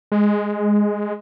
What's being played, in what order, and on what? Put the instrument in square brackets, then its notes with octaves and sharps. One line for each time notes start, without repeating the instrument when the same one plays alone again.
[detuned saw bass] G#3